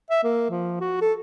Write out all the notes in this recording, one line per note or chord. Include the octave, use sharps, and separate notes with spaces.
E5
A#3
F3
F#4
A4